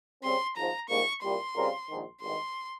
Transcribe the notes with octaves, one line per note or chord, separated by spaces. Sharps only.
C#3 G3 C4 C6
G#1 G#2 F3 A#5
A#1 G#2 G3 A#3 C#6
C2 A#2 G3 C6
C#3 G3 C4 F4 A#4
A#1 G#2 D#3
G#1 G2 D#3 C6